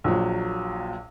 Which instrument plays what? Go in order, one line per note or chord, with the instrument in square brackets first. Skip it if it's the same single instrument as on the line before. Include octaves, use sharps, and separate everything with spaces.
[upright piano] A#1 A#2 F#3